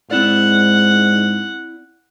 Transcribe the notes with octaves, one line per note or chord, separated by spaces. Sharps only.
G#2 C4 E4 D5 F#5